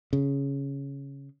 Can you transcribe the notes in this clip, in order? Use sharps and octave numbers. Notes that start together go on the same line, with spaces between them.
C#3